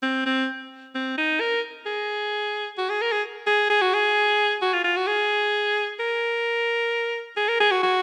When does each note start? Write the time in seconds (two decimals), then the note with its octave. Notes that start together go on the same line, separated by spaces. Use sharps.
0.02 C4
0.26 C4
0.95 C4
1.18 D#4
1.40 A#4
1.86 G#4
2.78 F#4
2.90 G#4
3.02 A#4
3.12 G#4
3.47 G#4
3.70 G#4
3.82 F#4
3.94 G#4
4.62 F#4
4.73 F4
4.84 F4
4.96 F#4
5.07 G#4
6.00 A#4
7.37 G#4
7.49 A#4
7.60 G#4
7.72 F#4
7.83 F#4